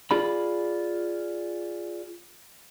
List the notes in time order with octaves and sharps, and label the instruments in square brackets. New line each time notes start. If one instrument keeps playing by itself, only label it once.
[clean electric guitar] F4 G#4 D5 B5